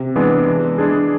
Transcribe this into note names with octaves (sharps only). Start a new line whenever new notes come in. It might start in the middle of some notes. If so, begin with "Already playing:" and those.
Already playing: C3
E3 G#3 B3 D4
E3
G#3 D4 G#4